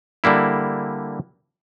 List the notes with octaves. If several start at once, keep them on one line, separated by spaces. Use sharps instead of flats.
D3 G3 A#3 E4